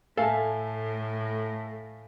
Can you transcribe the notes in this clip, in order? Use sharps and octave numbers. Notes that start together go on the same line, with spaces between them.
A2 A3 A4 F5 G#5